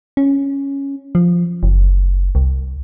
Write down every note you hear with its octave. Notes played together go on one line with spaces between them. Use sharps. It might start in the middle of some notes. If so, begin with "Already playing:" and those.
C#4
F3
F#1
C2